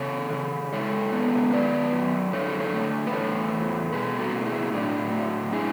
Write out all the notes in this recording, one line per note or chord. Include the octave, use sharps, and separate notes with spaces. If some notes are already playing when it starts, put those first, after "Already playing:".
Already playing: C#3 A4 C#5
C#3
G#3 A4 C#5
B3
F#2 B4 D5
F#2
D3 A4 C#5
A4 C#5
A3
B4
E2 A4 C#5
E2
B2 G#4 B4
F#4 A4
A3 A4
E4 G#4
A2 D4 F#4
A2
G#3 E4 G#4